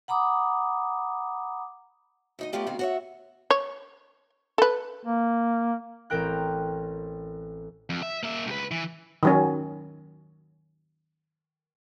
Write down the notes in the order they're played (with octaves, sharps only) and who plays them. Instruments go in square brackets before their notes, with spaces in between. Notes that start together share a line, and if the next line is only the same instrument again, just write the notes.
[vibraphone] F#5 A#5 B5 D6 D#6
[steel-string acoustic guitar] D2 D#4 D#5
A3 B3 E4 F4 G4 D5
D2 B2 D#3 C4 F5
F#4 C#5 E5
[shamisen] C#5
A4 B4
[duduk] A#3
[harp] A1 C4 A#4 G5 F#6
[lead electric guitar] F2
E5
A#3 E5
C#2 B4
E3
[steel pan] D#3 F#3 C#4